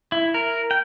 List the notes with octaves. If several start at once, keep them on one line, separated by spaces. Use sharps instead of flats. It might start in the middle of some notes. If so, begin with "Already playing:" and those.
E4
A#4
G5